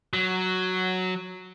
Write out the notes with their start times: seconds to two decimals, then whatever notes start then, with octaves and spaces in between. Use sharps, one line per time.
0.13 F#3